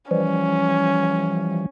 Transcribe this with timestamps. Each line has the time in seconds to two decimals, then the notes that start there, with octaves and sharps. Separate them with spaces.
0.11 E3 F3 G3 C#4